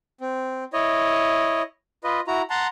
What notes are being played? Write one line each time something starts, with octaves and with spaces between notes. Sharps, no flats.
C4
E4 C#5 D#5
F4 B4 D#5
E4 F#4 A#5
F#5 A5 A#5 C6